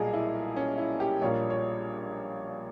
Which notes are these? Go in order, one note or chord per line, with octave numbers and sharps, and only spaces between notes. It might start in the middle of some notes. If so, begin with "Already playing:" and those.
Already playing: B1 A#2 G3 A#3 G#4
E4
C#4
E4
G4
A#1 A#2 G3 A#3 C#5
C#5